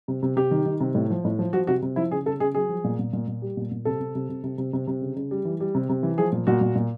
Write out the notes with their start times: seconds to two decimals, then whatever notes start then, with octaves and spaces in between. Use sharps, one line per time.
0.08 C3
0.23 C3
0.36 C3 G4
0.51 D#3
0.66 D#3
0.80 C3
0.95 A2
1.10 F3
1.25 A2
1.39 F3
1.53 F3 F#4
1.67 C3 F#4
1.82 C3
1.96 F3 E4
2.11 C#3 G#4
2.26 C#3 A4
2.40 C#3 G#4
2.55 F#3 G#4
2.69 F3
2.84 A#2
2.99 A#2
3.13 A#2
3.28 A#2
3.42 G3
3.57 A#2
3.71 A#2
3.85 C3 A4
4.00 C3
4.15 C3
4.29 C3
4.43 C3
4.58 C3
4.73 C3
4.87 C3
5.01 C#3
5.16 C#3
5.31 G3
5.45 E3
5.60 G3
5.75 C3
5.89 C3
6.03 E3
6.18 F3 G#4
6.32 A#2
6.47 A#2 F#4
6.61 A#2
6.75 A#2